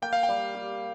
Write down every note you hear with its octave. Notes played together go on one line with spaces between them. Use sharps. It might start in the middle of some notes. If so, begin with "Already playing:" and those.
A#3 G5
F5
G5
G3
G4